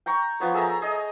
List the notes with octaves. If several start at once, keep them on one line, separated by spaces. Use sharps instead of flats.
G5 A#5 C#6
F3 B3 C#5
G#4 A4 E5 A#5
G#4 D#5